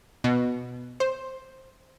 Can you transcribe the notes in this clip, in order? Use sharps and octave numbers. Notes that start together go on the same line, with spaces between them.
B2
C5